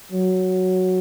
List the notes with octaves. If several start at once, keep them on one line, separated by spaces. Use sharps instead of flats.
F#3